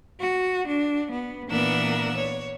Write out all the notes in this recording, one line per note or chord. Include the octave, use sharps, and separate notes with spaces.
F#4
D4
B3
A#2 E3 B3 D4 A#4 E6
C#5